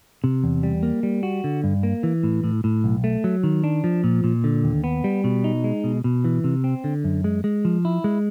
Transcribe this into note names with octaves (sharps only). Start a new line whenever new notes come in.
C3
E2
G3
A#3
G3
F#4
D3
G2
A#3
E3
A2
A2
A2
B1
A3
F#3
D#3
D4
F3
A#2
A#2
D3
D#2
B3
G3
B2
D#4
G#3
B2
B2
E3
C3
C4
D3
F#2
G#3
G#3
F3
E4
G#3